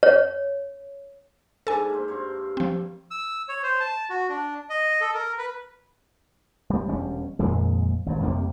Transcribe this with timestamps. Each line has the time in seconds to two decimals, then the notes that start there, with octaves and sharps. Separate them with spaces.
0.03 C#5
1.67 G#2 D4 E4 A4 G#5
1.90 A#3 C5
2.08 G2 C5 C#6
2.57 F3 C4
3.11 E6
3.49 C#5
3.63 C5
3.80 A5
4.10 F#4
4.29 D4
4.70 D#5
5.01 A4
5.14 A#4
5.38 B4
6.70 G3
6.88 E1 G3 C#4
7.39 G#1 F2 A#2 G#3
8.06 G#1 G2
8.23 F2 C3 G3 A#3